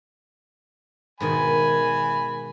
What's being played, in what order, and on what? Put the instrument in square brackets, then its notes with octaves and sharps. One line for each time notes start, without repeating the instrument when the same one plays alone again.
[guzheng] G#2 B2 D#3 [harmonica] G#5 B5